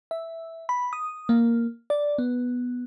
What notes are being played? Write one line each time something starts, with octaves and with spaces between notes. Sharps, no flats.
E5
B5
D#6
A#3
D5
B3